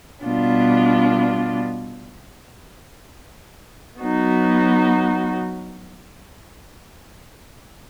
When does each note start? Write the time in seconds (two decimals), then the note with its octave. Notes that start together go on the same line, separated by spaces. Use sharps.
0.24 B2 G3 B3 D4 F4
4.01 F#3 B3 D#4 F#4